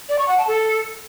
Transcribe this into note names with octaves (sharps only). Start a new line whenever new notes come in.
D5
C#6
F#5
A5
A4